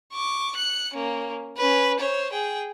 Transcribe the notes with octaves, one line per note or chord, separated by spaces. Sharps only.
C#6 D6
F#6 C#7
A#3 C#4
C#4 B4
C5 C#5
G#4 G5